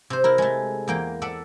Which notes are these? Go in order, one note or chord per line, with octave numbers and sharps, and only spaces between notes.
C3 C5
E4 A#4
G#3 A3
E2 A#3 G5
A4 D5 E5 F#5